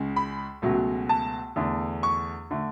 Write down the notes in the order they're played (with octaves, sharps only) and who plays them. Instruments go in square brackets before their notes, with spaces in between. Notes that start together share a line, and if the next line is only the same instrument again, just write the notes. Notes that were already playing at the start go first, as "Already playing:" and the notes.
Already playing: [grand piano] C#2 C#3 G#3
B5
C#2 B2 F#3 A3
A5
E2 D3 A3
C#6
D3 A3